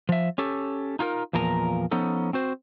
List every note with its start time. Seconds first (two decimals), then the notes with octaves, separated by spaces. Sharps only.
0.09 F3 E5
0.38 C#4 G4 A4
0.99 D#4 F4 G#4 A#4
1.33 E2 A#2 F3 A#4 A5 A#5
1.91 F3 B3 C#4 D#4 A4
2.33 C4 F#4 C5